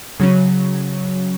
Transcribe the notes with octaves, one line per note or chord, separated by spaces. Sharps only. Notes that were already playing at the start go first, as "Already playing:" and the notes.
C#3 F#3 C#4